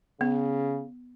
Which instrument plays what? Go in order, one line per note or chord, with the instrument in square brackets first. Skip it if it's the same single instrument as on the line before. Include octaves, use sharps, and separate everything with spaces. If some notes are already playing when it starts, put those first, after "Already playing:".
[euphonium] C#3 [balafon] B3